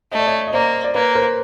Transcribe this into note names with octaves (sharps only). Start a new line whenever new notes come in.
A3 D#5
D5
C#5 D#5
D#5
A#3 C5 D5
D5
A#3 B4 C#5
A#4 C5